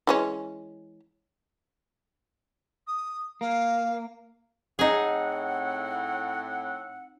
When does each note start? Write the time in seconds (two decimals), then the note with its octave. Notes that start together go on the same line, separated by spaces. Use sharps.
0.07 E3 G#3 C#4
2.87 D#6
3.41 A#3 F5
4.79 A2 C4 D#4 G#4 F#5